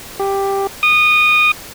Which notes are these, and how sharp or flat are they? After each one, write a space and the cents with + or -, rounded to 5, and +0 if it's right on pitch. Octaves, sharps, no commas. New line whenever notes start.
G4 +5
D#6 -20